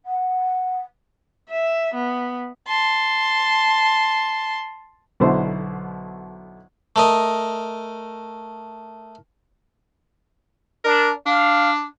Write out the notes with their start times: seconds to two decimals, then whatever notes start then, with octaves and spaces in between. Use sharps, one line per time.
0.05 F#5
1.50 E5
1.94 B3
2.68 A5 C6
5.20 B1 B2 D3 E4 C5 C6
6.96 A3 A#4 D#5
10.85 D4 A#4
11.26 D4 F5